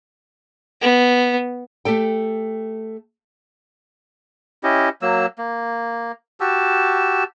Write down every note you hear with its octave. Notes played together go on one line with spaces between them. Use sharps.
B3
A3 G4 A4 G5
C#4 E4 G4 D#5
F#3 A#3 E6
A#3
F#4 G4 A5 E6